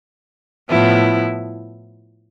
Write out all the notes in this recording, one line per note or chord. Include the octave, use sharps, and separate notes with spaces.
A2 F3 B3 E4